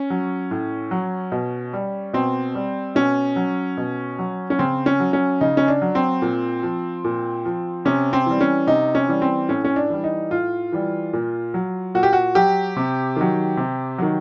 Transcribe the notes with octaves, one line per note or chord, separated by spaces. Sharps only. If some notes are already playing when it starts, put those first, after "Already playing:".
Already playing: C#4
F#3
A2
F#3
B2
G3
B2 C4
G3
B2 C#4
F#3
B2
F#3
C#4
C#3 C4
C#4
F#3
C#4
C#3 D#4
C#4
D4
F#3
C4
A#2
F3
A#2
F3
C3 C#4
C4
E3 G3
C#4
C3 D#4
C#4
E3 G3
C4
A2 C#4
C#4
D4
E3 G3
D#4
A2 F4
E3 G3
A#2
F#3
A#2 F#4
G4
F#4
F#3 G4
C3
D#3 F#3
C3
D#3 F#3